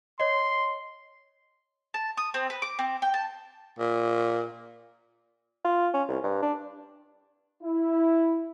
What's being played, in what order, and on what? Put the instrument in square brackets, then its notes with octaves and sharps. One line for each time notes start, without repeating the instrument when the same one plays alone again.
[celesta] C#5 D#5 [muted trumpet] C6
[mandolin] A5
D#6
C4
B4
D6
C4
G5
A5
[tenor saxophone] A#2
[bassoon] F4
C#4
C2
G2
D4
[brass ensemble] E4